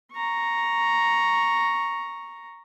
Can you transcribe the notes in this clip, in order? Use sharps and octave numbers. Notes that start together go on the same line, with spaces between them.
A#5 C#6